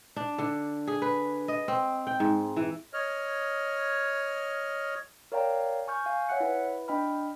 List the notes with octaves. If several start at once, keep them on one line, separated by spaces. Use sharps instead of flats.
D4
D3
G#4
B4
D#5
C4
G5
G#2
E3
C#5 D#5 F6
A#4 C#5 D5 F5 G5 A#5
G#5 C#6 F6 G6
F5 G#5
C#5 E5 F#5 F#6 C#7
E4 B4
D4 D#5 G5 B5 F6